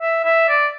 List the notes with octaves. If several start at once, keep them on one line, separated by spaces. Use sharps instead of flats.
E5
E5
D5